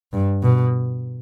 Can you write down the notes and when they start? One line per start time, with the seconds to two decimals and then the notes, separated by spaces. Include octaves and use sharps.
0.13 G2
0.43 B2